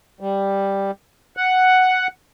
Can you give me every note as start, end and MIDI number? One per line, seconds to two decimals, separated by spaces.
0.21 0.91 55
1.37 2.07 78